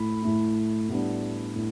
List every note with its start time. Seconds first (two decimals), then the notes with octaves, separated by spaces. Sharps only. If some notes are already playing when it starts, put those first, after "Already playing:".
Already playing: A2 A3 E4 B5
0.22 A2 A3 E4
0.89 A2 G3 B3 D4
1.56 A2